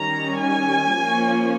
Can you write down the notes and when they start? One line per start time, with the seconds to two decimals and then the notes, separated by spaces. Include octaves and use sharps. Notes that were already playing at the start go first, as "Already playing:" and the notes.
Already playing: D#3 G3 C#4 A#5
0.40 G#5
0.94 F3 A#3 C#4